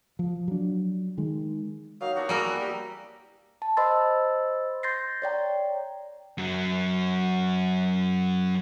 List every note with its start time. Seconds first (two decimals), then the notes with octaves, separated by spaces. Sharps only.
0.19 F3
0.48 F#3 D4
1.18 D#3 G#3
2.01 F#3 A#3 D#4 F5
2.15 B3 D4 E4 F#4
2.29 G3 A#3 G#4 A#4 E5 F#5
2.60 G4
3.62 A5
3.77 C5 D#5 B5 C6 E6 A6
4.83 C6 G6 A6 A#6 C7
5.22 C#5 D5 G5 A#5
6.38 F#2 F#3